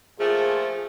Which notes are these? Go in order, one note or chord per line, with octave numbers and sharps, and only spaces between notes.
A#2 F3 A3 G#4